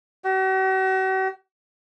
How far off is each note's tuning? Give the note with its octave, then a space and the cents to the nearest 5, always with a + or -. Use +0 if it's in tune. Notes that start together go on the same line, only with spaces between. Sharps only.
F#4 +45